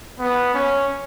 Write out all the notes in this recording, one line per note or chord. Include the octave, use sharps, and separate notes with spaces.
B3
C#4